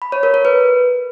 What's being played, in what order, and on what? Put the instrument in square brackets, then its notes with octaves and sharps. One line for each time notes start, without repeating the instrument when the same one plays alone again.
[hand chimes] B5
C#5
A#4
A#4
B4